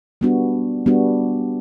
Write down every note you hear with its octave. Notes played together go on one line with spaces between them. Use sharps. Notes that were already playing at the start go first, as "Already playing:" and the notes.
G3 B3 D4 F#4
G3 B3 D4 F#4